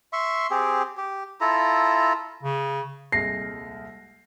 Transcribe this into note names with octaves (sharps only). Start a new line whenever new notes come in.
E5 C6 C#6
C4 G4 G#4
G4
E4 F4 A4 A#5
C#3
D#1 C2 G#3 A#6 C7